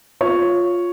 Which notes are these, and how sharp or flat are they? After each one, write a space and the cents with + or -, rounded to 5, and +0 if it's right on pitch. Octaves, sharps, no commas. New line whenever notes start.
F4 +10 C#5 +0